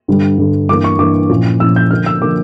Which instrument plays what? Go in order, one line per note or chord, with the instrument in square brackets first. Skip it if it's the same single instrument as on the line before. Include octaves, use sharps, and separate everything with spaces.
[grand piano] G2 D3 G3
G2 D3 G3
G2 E3 A#3 D6
C#6
G2 E3 A#3 D6
A#2 F3 C#4 E4
A#2 F3 C#4 E4 E6
G6
D3 F3 A#3 F6
E6
D3 F3 A#3 D6